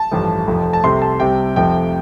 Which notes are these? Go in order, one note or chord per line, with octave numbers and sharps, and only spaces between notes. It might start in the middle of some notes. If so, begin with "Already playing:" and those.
Already playing: A5
A1 G2 F3 A3
F1 F2 F3 A3
A5
C2 C3 A3 C6
A5
C2 C3 G3 G5
F1 F2 C3 F3 A3 G5